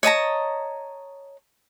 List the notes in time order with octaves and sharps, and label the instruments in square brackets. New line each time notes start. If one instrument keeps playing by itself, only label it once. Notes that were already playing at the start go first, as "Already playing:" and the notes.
[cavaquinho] C#5 D#5 A5 A#5